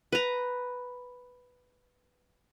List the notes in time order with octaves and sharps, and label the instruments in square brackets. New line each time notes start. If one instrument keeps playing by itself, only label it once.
[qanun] B4 A#5